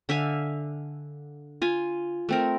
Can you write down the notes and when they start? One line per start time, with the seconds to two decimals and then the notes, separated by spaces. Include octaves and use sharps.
0.09 D3 E5 F5 G#5
1.62 F4 G#5
2.29 A3 C4 A#4